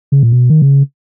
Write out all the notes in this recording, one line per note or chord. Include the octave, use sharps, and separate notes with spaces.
C#3
A#2
B2
D#3
C#3